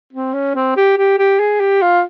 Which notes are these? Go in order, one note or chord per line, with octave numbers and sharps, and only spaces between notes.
C4
C#4
C4
G4
G4
G4
G#4
G4
F4